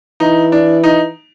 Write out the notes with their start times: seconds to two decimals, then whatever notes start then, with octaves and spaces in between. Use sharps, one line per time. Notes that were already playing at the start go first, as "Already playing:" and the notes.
0.20 E3 D#4
0.52 D4
0.83 D#4